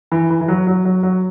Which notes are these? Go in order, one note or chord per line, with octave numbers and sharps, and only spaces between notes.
E3
E3
E3
F#3
F#3
F#3
F#3